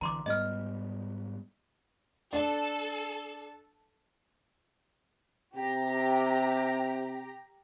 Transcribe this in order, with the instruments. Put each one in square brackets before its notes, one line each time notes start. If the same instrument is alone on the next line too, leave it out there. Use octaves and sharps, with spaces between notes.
[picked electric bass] B1 D3 E3 [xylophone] A#5 C6 D6
[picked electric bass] G#2 G3 B3 [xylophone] D#5 F6
[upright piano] D4 [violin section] A4
[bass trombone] C3 [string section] G4 A#5